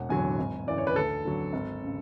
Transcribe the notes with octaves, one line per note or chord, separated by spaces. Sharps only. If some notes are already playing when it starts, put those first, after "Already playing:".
Already playing: E1 F#5
E2 D3 F#3 G#5
G#1
F#2 C#3 E3 D5
C#5
B4
D2 A4
D3 F#3
G#1
C#3